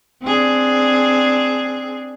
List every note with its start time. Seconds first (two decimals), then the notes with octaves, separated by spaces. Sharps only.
0.22 C4 D4 G#4